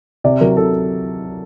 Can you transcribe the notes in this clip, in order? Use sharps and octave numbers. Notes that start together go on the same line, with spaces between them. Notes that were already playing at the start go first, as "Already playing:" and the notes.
C3 D5
F#3 A#4
C3 A4